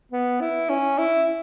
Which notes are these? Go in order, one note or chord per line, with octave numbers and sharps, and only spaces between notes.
B3
E4
C#4
E4